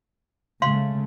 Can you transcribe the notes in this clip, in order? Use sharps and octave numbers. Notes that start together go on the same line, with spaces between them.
C#3 G#3 A3 F5 C6